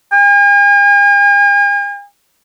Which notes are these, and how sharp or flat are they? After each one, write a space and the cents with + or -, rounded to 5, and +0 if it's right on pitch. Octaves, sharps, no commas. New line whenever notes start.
G#5 -45